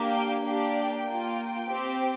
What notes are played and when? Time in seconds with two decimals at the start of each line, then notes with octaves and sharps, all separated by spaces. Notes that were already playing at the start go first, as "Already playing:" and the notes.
Already playing: A#3 D4 G4
0.11 G5
0.43 A#3 D4 G4 G5
1.07 A#3 F4
1.70 C4 G4